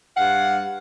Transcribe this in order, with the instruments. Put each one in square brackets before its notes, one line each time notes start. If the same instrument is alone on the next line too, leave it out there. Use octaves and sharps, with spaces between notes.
[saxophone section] G2 F5 F#5